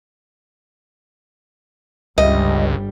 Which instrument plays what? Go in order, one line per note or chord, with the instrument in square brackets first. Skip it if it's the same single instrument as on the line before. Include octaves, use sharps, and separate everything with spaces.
[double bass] G1 G3 [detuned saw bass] C#2 [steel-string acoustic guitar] D#5